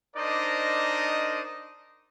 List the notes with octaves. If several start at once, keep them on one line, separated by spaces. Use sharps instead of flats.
D4 D#4 A#4 C5 D5 D#5